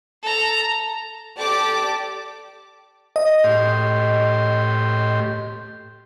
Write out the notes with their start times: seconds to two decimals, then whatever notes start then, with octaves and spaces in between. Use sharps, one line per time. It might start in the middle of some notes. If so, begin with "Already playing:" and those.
0.23 A4 A#5
1.38 G4 A4 D5 A5 D6
3.16 D#5
3.44 A2 G4 C6